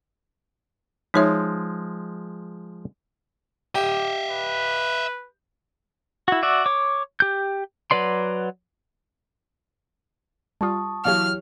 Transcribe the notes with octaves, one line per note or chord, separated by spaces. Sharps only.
F3 G#3 D#4 C#5 E5
G4 D#5 E5
B4
E4 F#4
F#4 D5 E5
C#5 D6
G4 G6
F#3 B4 D5 C6
G3 F4 A5 C#6 D#6
E3 F#3 G4 C#5 F5 F6